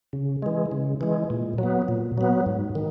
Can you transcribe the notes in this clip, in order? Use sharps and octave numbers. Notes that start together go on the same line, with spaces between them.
C#3
E3 G#3
C#3
E3 G#3
A#2
F#3 B3
A#2
F#3 B3
G#2
D#3